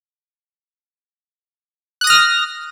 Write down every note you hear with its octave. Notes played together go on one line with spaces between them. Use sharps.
D#6 F6 F#6 A#6